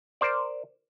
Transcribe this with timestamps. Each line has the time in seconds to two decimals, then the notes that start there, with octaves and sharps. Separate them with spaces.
0.21 A#4 C5 D5